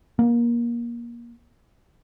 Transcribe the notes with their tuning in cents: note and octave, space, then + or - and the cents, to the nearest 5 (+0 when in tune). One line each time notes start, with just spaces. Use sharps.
A#3 +25